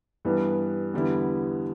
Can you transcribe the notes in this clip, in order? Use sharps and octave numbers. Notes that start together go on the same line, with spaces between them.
G2 E3 G3 B3
E2 D3 G3 B3 E4